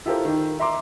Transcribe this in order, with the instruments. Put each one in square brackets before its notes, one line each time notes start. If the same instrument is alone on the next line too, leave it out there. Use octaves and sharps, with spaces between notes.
[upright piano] E4 F4 G4 A4 A#4 C5
D#3
E5 A#5 C6 D6